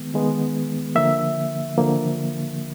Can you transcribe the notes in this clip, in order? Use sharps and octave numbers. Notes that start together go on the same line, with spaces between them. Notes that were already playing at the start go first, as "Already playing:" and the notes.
Already playing: D#3 G#3 B3
D#3 G#3 B3
D3 F3 A#3 E5
D3 F3 A#3